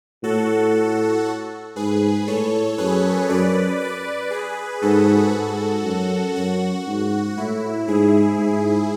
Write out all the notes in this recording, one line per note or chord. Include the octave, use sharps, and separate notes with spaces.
A2 F#4 A4
G#2 G#4 B4
A2 A4 C#5
F#2 G#4 B4
F#2 B4 D5
B4 D5
G#4 B4
G#2 F#4 A4
G#2
F#2
F#2 F#4
G#2
A2 E4
G#2 E4 G#4
G#2